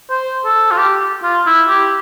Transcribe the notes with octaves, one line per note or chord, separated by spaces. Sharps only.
C5
A4
F4
G4
F4
E4
G4